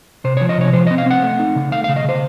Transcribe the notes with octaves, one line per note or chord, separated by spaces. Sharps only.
C3 C5
F3 C#5
D#5
C3 C#5
F3 C5
C4 D#5
F5
C4 F#5
A3
D#4
C#3
A3 F5
C#3 F5
D#5
C#3 C5